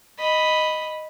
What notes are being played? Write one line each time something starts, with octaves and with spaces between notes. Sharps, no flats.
D#5 B5